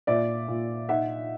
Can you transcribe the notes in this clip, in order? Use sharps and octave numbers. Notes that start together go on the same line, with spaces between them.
A#2 D5 E5
A#2
D#4 E5 F#5